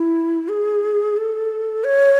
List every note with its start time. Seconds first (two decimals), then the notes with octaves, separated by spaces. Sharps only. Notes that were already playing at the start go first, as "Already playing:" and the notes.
Already playing: E4
0.49 G#4
1.17 A4
1.84 C#5